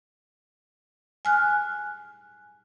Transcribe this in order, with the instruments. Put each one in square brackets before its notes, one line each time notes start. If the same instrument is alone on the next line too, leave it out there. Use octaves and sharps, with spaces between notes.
[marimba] G#5 F6 F#6